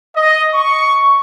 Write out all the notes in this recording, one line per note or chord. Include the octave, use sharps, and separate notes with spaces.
D#5
C#6